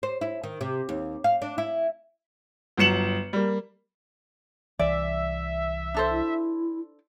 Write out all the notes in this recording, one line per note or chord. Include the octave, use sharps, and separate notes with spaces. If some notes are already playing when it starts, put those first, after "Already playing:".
C5
E4
D#3
C3
D#2
F5
D4
E4
G1 F#3 C#7 E7 F#7
G3 A#3
C2 E3 D5 E5
D4 A4 C5
E4